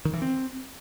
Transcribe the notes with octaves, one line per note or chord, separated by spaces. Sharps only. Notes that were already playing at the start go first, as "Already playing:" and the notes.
D#3
E3
C4